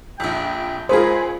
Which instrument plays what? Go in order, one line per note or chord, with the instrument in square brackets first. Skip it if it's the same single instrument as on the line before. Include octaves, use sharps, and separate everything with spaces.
[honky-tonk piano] A#1 F2 [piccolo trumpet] G5
[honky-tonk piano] C#2 G#4 [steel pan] F4 A#4 D#6 [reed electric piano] C5 [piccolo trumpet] B5